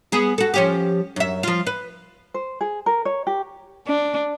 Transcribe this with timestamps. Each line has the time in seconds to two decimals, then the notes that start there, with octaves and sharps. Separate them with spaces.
0.12 B3 G#4
0.38 F#4 A4
0.54 F3 C#4 G4
1.16 F#2 E5
1.43 F3 F4
1.67 B4
2.34 C5
2.61 G#4
2.86 A#4
3.05 C#5
3.27 G4
3.87 D4